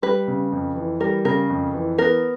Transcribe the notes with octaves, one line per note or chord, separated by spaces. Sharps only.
G3 B4
C#3
F2
E3
G3 A#4
C#3 A#4
F2
E3
B3 A#4